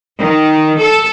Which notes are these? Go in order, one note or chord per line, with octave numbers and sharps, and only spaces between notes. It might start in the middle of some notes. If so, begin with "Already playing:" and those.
D#3
A4